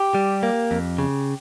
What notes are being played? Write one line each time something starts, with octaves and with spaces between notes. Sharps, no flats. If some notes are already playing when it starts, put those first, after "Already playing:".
Already playing: G4
G3
A#3
F2
C#3